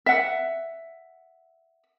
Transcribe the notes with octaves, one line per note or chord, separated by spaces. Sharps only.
E5 F#5